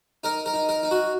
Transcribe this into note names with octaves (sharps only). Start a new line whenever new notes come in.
D#4 A#4
A#4
D#4
A#4
D#4
F#4